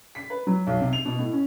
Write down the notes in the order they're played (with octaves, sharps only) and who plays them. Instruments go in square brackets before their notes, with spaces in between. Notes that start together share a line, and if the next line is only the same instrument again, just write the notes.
[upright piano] B6
B4
F#3
B1
C3
F7
B2
A2
C#4